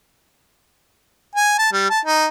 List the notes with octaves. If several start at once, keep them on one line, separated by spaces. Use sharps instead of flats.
G#5
A5
G3
A5
D#4